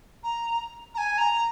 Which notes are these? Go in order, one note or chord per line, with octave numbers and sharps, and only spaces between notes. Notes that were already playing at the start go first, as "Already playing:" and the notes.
A#5
A#5
G#5
A#5